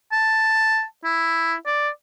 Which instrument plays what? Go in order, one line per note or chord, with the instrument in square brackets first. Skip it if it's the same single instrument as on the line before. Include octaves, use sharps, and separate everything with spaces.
[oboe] A5
E4
D5